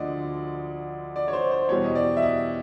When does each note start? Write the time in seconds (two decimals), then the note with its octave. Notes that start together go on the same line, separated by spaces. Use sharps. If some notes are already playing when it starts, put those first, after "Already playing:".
Already playing: D2 D3 F3 D5 D#5
1.16 D5
1.28 C#5
1.33 C5
1.51 C5
1.69 E2 B2 G3 C#5
1.84 D#5
1.95 D5
2.17 E5
2.22 D#5